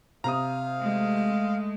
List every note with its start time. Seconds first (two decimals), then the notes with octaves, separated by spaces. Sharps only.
0.24 C3 F5 A#5 D#6
0.78 G#3 A3